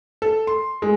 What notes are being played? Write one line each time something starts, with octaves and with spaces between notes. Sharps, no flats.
A4
C6
G#3